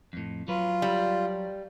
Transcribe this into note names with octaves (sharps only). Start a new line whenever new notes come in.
F2 A2
F#3 F4 B4
G3